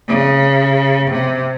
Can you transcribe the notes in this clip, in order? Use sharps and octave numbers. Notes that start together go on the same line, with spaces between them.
C#3
C3